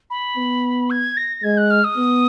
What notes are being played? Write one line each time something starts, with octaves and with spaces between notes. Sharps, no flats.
B5
B3
G#6
A#6
G#3 G#6
F#6
F6
D#6
B3